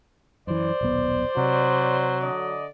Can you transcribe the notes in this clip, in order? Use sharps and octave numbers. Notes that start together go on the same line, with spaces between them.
F#2 E3 C5 D5
D#1 B1 B3
C3 F#3
D3 D5 D#5